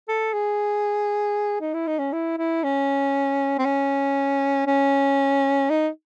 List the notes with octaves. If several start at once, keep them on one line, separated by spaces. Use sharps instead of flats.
A4
G#4
D#4
E4
D#4
C#4
E4
E4
C#4
C4
C#4
C#4
D#4